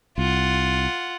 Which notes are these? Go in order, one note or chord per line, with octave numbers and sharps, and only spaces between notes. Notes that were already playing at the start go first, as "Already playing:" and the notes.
C2 F4 F#5